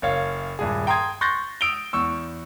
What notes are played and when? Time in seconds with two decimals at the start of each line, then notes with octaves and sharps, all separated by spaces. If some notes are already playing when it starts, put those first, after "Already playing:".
0.02 F#1 C#5 F5
0.59 D#1 G2 G#4
0.87 G5 A#5 C6 D#6 G#6
1.21 C6 C#6 F#6 G6 A6 A#6
1.61 D#6 E6 D7 F7 G7
1.93 E2 C#6 E6